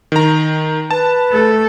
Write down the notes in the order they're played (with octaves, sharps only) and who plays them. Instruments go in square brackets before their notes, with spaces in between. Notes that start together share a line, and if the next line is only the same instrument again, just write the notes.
[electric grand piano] D#3 A#5
[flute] B4 [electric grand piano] A5
[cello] A3 A4